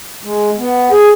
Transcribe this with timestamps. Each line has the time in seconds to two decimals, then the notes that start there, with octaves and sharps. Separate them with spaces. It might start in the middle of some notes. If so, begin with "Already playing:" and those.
0.24 G#3
0.58 B3
0.91 G#4